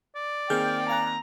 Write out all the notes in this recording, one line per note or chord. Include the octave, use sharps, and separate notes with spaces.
D5
D#3 A#3 C4 G#4 G5 F6 G6
F5 G#5 A#5 F#6